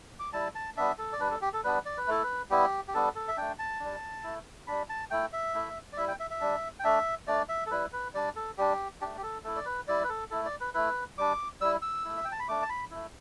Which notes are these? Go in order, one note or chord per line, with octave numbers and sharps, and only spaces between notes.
D6
G3 E4 A5
A5
G3 B3 D4 E5
A4
D5
G3 D4 B4
A4
G4
A4
G3 B3 D4 B4
D5
B4
A3 E4 A4
B4
G3 B3 E4 G4
G4
G3 B3 D4 A4
A4
E5
A3 D4 G5
A5
G3 D4
A3 E4
G3 D4 B5
A5
A3 E4 G5
E5
A3 E4
D5
G3 E4 E5
G5
E5
E5
G3 D4
G5
A3 D4 E5
A3 D4 D5
E5
A4
G3 E4 B4
B4
G3 D4 D5
A4
G3 D4 G4
A3 D4 G4
G4
A4
A3 E4 A4
D5
B4
G3 E4 D5
B4
A4
A3 E4 A4
D5
B4
A3 E4 B4
G3 D4 D6
G3 E4 E6
E6
A3 E4
E5
G5
A5
B5
A3 D4 D6
A5
B5
A3 E4